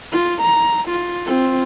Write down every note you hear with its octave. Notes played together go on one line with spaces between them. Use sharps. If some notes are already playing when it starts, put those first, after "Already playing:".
F4
A#5
F4
C4 F4